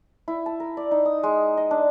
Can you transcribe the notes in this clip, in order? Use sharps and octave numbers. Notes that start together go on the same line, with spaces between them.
E4
A5
A#4
D5
D#4
D#6
G#3
D#5
D4